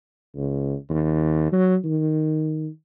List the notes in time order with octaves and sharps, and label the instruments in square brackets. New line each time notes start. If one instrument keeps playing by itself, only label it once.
[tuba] C#2
D#2
F#3
D#3